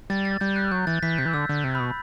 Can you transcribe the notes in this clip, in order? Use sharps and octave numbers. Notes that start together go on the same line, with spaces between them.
G3 A6
A6
G3 G6
F#6
F#3 G6
E3 A6
E3 B6
C3 G6
E3
D3 E6
D3
C3
B5
B2